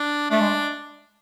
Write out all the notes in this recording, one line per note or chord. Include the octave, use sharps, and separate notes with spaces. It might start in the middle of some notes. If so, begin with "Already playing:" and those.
Already playing: D4
A3 D4
G#3